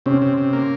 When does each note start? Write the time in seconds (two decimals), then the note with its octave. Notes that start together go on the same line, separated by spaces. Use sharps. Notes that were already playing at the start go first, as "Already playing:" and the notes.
0.06 C3 C#4
0.22 C3
0.37 C3
0.53 A#3